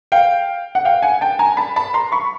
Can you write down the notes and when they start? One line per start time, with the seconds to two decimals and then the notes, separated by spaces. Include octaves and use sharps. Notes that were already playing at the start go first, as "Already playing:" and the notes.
0.12 F5 G5
0.75 F#5
0.85 F5 G5
1.02 F#5 G#5
1.21 G5 A5
1.39 G#5 A#5
1.57 A5 B5
1.76 A5 B5
1.94 A#5 C6
2.12 B5 C#6